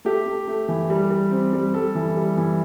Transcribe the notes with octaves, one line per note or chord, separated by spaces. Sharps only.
A3 G4
A3
A3
E3
G3
G3
C4
G3
G3 A4
E3
G3
E3